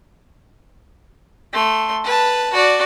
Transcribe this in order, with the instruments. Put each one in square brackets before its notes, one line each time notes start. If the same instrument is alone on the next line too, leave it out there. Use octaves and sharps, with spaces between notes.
[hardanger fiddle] A3 C6
B4 A5
F#4 D5